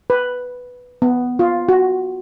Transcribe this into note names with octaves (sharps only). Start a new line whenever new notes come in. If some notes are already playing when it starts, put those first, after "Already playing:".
B4
B3
F4
F#4